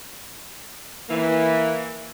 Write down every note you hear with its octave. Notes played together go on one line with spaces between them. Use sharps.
E3 A#3